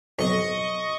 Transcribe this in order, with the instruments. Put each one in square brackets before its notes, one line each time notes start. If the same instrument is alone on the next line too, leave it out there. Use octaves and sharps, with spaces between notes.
[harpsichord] B1 F2 [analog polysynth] D#5 C#6